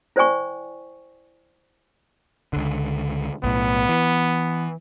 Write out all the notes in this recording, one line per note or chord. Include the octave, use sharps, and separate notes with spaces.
E4 C5 D5 G5 G#5 C#6
C#2 D3
B1 A2 B3
E3